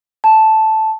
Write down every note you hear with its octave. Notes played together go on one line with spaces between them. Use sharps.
A5